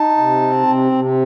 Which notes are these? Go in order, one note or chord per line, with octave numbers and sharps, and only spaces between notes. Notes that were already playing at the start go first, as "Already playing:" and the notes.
Already playing: D#4 A5
C3
C4
C3
C3